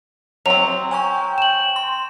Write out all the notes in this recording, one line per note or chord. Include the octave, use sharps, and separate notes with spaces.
F#3 C4 F7
G5 G#5 A#5 C#6
E7 F#7
C6